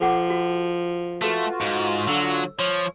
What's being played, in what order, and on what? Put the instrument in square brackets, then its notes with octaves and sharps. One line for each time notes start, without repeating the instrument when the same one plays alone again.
[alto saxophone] F3 [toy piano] A4 F#5 D6
[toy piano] F#4
[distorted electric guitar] A3 [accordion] F4 F#4 [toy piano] A4 B4
[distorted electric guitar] G#2
[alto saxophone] D3 [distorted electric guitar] F#3 [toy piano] E6
[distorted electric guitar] F3 [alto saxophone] C#5